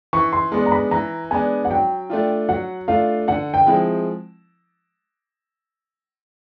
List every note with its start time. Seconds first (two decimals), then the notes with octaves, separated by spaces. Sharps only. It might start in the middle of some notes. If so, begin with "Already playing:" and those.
0.13 E3 C#6
0.33 C6
0.52 G#3 B3 D4 C6
0.66 A#5
0.72 B5
0.91 E3 A#5
1.31 G#3 B3 D4 G#5
1.65 F#5
1.71 F#3 G5
2.10 A3 D4 F4
2.49 F#3 F#5
2.88 A3 D4 F4 F5
3.28 D3 F#5
3.54 G5
3.67 F3 G#3 C4 E4